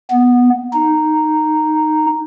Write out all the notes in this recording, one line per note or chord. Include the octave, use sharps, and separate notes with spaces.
B3
D#4